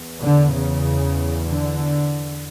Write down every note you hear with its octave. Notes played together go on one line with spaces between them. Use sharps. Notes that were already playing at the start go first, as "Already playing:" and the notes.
Already playing: E2
D3
C#3
D3